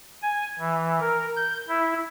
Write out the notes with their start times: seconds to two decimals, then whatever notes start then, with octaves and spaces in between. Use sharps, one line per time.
0.22 G#5
0.59 E3
1.01 A#4
1.36 G6
1.68 E4